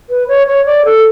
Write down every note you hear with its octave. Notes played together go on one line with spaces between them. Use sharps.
B4
C#5
C#5
D5
A4